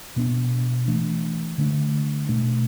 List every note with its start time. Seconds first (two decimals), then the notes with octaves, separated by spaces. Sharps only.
0.16 B2 B3 D4
0.88 E3 A3 D4
1.58 D3 A3 D4
2.29 B2 A3 D4